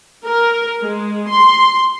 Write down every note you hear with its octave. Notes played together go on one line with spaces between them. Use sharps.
A#4
G#3
C6